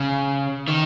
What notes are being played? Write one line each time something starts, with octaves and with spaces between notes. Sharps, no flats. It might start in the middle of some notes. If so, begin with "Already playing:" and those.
Already playing: C#3
D#3